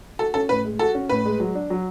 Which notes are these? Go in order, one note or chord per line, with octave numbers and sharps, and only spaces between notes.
F#4 A4
C#4 A4
A2 B4
G#3
F#4 A4
C#4
A2 B4
G#3
F#3
D4
F#3